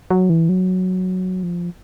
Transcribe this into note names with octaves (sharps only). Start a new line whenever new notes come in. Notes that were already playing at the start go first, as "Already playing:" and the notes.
F#3
E3
F#3
F3